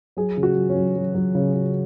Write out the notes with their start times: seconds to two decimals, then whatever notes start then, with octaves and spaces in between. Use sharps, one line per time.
0.17 F#3 G#4
0.37 C#3
0.43 F#4
0.56 F#3
0.69 C#4
0.76 F#3
0.96 F#3
1.15 F#3
1.35 C#3
1.54 C#3